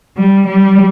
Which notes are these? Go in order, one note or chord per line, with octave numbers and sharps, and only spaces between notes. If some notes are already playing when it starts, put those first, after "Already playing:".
G3
G3